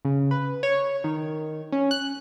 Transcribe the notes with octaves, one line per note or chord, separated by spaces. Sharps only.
C#3
B4
C#5
D#3
C#4
F#6